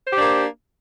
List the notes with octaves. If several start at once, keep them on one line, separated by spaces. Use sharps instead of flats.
A#3 D4 G4 C5